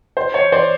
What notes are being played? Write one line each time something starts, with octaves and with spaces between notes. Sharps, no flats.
C5
C#5
C5 D5